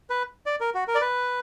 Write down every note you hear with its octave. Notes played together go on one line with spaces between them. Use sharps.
B4
D5
A#4
F#4
A#4
D5
B4